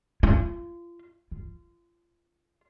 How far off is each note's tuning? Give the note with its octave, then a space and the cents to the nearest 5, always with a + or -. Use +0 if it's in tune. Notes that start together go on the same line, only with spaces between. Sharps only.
F4 -30
F4 -25